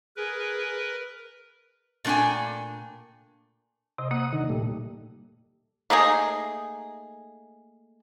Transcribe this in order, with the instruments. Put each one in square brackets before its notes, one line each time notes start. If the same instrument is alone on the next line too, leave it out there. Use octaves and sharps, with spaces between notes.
[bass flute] G#4 [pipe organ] A#4 B4
[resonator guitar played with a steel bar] A#2 A3 D4 G5 G#5
[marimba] C3 [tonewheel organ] C5 D#5
[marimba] A#3 [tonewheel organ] F#5 D#6
[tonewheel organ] D3 D#3 D#4
A#2 G3 A3
[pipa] A3 A#3 D#4 G#4